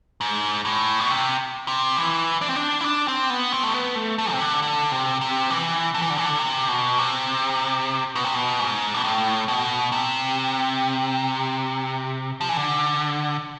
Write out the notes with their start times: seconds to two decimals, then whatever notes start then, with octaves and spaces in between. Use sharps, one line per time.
0.21 G#2
0.65 A2
1.00 B2
1.09 C3
1.68 C3
1.97 E3
2.41 D4
2.49 C4
2.56 D4
2.81 E4
2.85 D4
3.08 C4
3.30 B3
3.52 C4
3.63 A3
3.74 B3
3.96 A3
4.18 A3
4.32 C3
4.40 D3
4.62 D3
4.92 C3
5.21 C3
5.50 E3
5.94 D3
6.02 E3
6.10 D3
6.17 E3
6.25 D3
6.39 C3
6.68 B2
6.98 C3
8.15 B2
8.25 C3
8.34 B2
8.59 G#2
8.94 B2
9.04 A2
9.48 B2
9.92 C3
12.41 F3
12.49 E3
12.57 D3